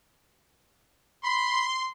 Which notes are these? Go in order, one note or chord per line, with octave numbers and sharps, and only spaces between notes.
B5 C6